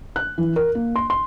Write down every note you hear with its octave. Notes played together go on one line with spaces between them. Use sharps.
F#6
E3
A#4
A#3
C6
C6